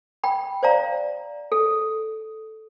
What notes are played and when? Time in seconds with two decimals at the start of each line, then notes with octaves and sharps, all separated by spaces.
0.24 G5 B5
0.63 C5 D5 F5 A#5
1.52 A4